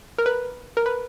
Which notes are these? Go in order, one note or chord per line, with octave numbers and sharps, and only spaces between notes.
A#4
B4
A#4
B4